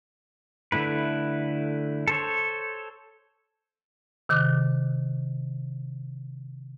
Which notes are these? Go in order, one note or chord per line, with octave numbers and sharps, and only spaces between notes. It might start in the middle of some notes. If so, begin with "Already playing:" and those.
D3 A3 E4 B4
A4 C5 C#5
C3 D#3 D6 F#6